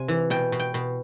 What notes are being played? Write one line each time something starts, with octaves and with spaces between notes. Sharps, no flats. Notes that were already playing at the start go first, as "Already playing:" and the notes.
Already playing: C3 G#5
E3
B2 G5
B2
G5
B2